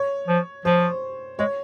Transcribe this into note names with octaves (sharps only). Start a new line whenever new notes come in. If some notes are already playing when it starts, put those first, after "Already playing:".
Already playing: C#5
F3
F3 C5
G#3 C#5